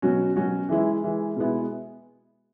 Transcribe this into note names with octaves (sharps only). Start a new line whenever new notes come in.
B2 F#3 C#4 F#4
B2 F#3 C#4 F#4
E3 G#3 E4
E3 G#3 E4
B2 G#3 B3 E4